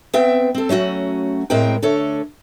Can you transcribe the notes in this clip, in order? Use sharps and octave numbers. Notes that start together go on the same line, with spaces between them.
B3 C4 E5 G5
C4 A4
F#3 A3 C#4 F#4
A2 G#3 C4 A#4 G5
D3 A3 A4 C#5